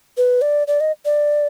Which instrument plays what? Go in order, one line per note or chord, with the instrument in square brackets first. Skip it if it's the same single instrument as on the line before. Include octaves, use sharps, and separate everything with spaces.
[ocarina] B4
D5
D5
D#5
D5